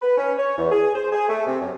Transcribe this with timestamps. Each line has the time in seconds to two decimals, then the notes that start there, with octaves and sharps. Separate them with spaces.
0.02 B4
0.17 C#4
0.38 C#5
0.58 E2
0.72 G#4
0.95 C5
1.12 G#4
1.29 A3
1.47 C3
1.61 F#2